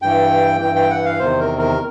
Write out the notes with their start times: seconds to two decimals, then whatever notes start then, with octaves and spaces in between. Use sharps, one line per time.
0.02 G2 E3 G5
0.61 G2 E3 G5
0.76 G5
0.90 F#5
1.05 F5
1.19 E2 C3 D#3 C5
1.40 A#4
1.59 A#4